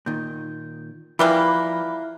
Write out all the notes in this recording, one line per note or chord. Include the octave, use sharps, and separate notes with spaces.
A#2 D#3 G6
E3 F3 G3 A#3 E4 E5 B5 F#6